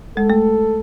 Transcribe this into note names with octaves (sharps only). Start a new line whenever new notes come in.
G#3 A4
A3